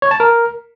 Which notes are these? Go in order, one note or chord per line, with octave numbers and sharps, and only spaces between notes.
C#5
A5
A#4